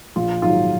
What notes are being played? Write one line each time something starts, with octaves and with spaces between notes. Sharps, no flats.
A#1 F4
G#2 D#3 F#3 F4